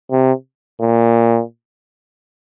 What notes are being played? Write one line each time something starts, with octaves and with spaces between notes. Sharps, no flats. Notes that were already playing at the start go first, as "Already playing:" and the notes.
C3
A#2